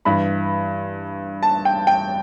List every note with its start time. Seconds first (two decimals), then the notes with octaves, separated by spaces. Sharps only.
0.05 G2 E3 B5
1.43 A5
1.65 G5
1.87 G5